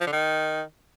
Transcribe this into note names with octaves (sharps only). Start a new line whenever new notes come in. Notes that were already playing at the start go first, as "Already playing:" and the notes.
F3
D3
D#3